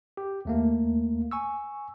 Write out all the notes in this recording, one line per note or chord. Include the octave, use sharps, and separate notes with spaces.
G4
D#2 A3 A#3
G#5 C#6 E6